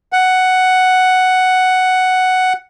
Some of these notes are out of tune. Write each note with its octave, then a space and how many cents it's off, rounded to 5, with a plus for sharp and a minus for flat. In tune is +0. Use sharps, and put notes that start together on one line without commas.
F#5 +5